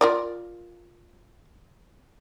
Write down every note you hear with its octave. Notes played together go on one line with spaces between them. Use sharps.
F4 A#4 D5